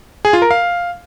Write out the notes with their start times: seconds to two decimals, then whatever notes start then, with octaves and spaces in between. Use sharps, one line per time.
0.25 G#4
0.33 F4
0.42 A#4
0.51 F5